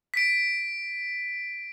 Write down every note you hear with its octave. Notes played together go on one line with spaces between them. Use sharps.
B6 D7